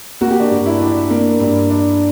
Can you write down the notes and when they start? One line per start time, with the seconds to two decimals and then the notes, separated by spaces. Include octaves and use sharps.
0.21 A#3 F#4
0.30 G4
0.40 D4 F#4
0.50 G2
0.66 E4
0.81 D4
1.10 A#3
1.40 G2
1.70 D4